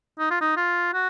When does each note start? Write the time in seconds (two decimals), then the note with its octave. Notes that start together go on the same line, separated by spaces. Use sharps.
0.19 D#4
0.30 F4
0.41 D#4
0.56 F4
0.93 F#4